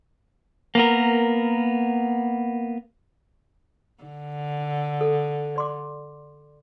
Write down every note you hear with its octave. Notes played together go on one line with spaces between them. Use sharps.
A#3 B3 A#4
D3
A4
D5 C6 D6